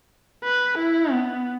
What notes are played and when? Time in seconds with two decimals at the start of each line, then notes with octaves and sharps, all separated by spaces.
0.44 B4
0.79 E4
1.13 B3